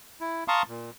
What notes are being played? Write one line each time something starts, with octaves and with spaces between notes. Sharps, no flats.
E4
F5 A5 A#5 C6 C#6 D#6
A#2